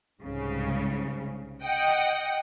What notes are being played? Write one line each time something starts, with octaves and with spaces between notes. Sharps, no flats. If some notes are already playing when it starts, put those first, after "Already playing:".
C2 G#2 C#3
D#5 F#5 G5